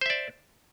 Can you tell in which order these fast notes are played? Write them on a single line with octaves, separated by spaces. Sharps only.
C5 E5 D5